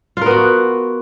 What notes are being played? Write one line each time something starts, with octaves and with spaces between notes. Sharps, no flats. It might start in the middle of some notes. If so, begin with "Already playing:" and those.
B3 F4 F#4 A#4